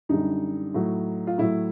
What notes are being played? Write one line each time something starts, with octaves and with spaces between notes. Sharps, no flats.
F#2 D3 G3 D#4
A2 F#3
F4
A2 F#3 E4